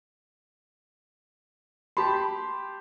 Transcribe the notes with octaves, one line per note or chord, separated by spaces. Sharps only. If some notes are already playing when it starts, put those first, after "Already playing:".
G4 A5 B5 C6